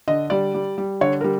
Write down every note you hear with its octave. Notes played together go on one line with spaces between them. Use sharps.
D3 D#5
G3 D5
G3
G3
D3 C#5
G3 A#4